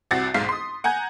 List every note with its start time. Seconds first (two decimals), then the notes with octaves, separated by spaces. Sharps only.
0.11 C2 C3 F#4 F#5 A6
0.34 B1 G#2 F5 B6 C7
0.49 C6 D#6
0.84 F#5 G#5 A#5 G6 G#6